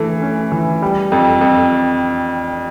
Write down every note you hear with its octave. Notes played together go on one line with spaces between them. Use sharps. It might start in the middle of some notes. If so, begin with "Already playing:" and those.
Already playing: E3 A3
C#4
E3
G3
F2
F2